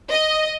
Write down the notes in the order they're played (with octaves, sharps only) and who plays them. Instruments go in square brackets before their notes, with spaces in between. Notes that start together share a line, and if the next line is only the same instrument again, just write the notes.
[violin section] D#5